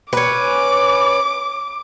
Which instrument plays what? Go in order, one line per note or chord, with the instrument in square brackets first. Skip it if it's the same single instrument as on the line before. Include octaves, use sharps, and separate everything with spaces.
[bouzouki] C#4 B4 [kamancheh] D6